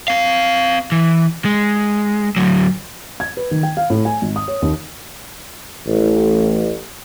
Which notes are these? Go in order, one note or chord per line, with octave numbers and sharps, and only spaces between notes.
C4 F5
E3
G#3
D2 F#3
G#6
B4
D#3
G5
F5
A2
G#5
G#1
D#6
C#5
D#2
A1